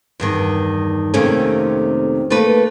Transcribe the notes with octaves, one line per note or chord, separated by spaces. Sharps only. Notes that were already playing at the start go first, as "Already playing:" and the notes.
E2 G2 D#3
F2 C3 D#3 A3 A#3 C#4
A3 A#3 B4